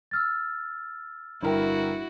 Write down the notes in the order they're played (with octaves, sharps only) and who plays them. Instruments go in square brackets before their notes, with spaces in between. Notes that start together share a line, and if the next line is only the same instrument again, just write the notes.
[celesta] E6 F6 A6
[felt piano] G1 A#4 G5 [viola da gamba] E4 F#4